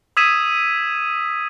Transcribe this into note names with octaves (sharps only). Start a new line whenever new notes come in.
D#6 E6 G#6 B6 D#7 E7